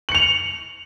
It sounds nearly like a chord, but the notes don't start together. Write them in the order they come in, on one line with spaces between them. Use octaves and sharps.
F#7 C#7 F7